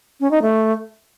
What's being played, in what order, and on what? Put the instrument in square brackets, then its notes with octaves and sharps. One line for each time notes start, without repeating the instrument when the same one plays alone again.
[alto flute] C#4
D#4
A3